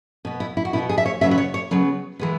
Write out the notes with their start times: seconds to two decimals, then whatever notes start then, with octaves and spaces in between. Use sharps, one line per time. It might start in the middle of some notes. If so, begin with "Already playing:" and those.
0.25 B2 B3
0.40 E4
0.57 E4
0.65 F#4
0.73 B2 B3 E4
0.89 G#4
0.98 E5
1.06 C#5
1.21 C#3 F#3 B3 E5
1.31 B4
1.38 C#5
1.54 C#5
1.71 C#3 F#3 B3
2.19 E3 G#3 B3